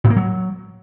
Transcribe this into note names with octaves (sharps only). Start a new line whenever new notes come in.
A2
A#3
F#3